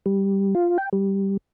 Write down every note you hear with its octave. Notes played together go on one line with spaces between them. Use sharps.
G3
F4
G5
G3